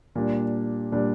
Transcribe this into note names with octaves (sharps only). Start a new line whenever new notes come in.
A#2 G3 D4
A#2 G3 D4